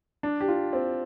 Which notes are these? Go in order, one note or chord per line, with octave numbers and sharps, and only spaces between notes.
D4
G4
F4
C4